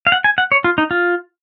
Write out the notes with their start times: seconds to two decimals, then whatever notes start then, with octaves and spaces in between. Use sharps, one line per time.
0.07 F5
0.12 F#5
0.24 G#5
0.38 F#5
0.52 C#5
0.64 F4
0.78 D#4
0.91 F4